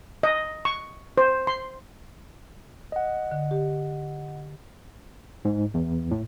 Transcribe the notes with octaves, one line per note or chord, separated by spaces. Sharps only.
D#5
C#6
C5
C6
D#5 F#5
D3
G4
G#2
E2
A2